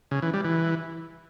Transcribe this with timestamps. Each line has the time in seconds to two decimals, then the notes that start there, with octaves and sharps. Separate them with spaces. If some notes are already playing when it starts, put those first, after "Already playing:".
0.11 C#3
0.22 E3
0.33 G3
0.45 E3